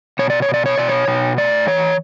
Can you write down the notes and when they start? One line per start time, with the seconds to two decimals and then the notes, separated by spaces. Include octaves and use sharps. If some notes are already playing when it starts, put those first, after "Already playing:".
0.19 B2 C#5
0.30 D5
0.42 C#5
0.49 B2
0.54 D5
0.66 C#5
0.78 B2 D5
0.88 C#5
1.08 B2
1.38 A2 D5
1.67 E3 C#5